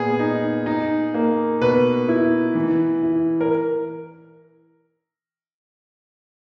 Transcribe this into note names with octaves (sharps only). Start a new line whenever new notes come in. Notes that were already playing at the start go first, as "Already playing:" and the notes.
Already playing: A#2 B3 G#4
D#4
D#4
A#3
B2 B4
E4
E3
E4
A#4